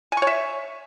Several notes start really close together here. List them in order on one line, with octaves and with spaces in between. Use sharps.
G#5 C#6 C#5 E5